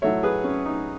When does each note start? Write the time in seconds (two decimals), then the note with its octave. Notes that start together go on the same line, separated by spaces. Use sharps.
0.02 A2 F#3 A3 C#5 E5
0.23 G#4 B4
0.44 C#4
0.66 D#4